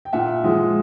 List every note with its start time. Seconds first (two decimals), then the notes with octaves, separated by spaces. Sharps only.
0.05 G5
0.13 A#2 E5 F#5
0.44 F3 G#3